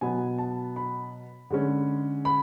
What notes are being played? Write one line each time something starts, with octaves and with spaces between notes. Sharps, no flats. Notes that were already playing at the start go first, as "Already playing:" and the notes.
B2 F#3 B3 G#5
A5
B5
D3 G#3 C#4
B5